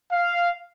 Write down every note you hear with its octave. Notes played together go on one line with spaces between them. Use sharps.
F5